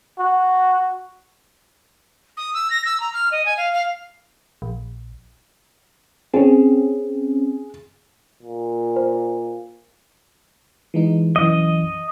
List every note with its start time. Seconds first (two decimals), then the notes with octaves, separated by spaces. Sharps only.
0.19 F#4
2.37 D#6
2.54 E6
2.70 A#6
2.85 E6
3.00 A#5
3.14 F6
3.32 D#5
3.46 G#5
3.57 F5
3.73 F5
4.62 A#1
6.34 C4 C#4 G#4
8.43 A#2
8.96 C5
10.94 E3 G#3 D#4
11.36 B1 F#2 E3 D#5